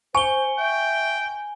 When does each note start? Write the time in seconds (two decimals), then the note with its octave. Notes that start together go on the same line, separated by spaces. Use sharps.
0.15 C5 G#5 C#6 G7
0.58 E5 G5